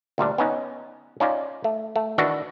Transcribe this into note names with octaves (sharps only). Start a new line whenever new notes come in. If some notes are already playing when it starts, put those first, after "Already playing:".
D2 A#2 G3 D4
B3 C#4 D#4
C#4 D#4 F4 D5
A3
A3
D#3 E3 D4 F#4